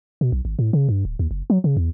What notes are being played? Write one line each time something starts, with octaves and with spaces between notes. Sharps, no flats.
B2
B1
G#1
A2
C#3
G2
D1
D#2
F#1
F#3
C#3
E2